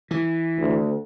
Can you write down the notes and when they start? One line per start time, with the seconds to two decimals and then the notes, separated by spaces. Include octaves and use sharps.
0.11 E3
0.59 D2